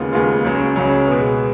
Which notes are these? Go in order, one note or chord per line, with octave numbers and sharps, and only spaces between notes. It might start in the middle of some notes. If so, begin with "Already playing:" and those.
Already playing: D#2 C#3 G#3 B3 F4
D#2 C#3 G#3 B3 F4
C#2 C#3 F#3 C#4
C#2 C#3 F#3 C#4
B2 G#3 B3